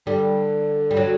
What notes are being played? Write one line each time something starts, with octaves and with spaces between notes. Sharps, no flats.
D3 G3
G3
F#3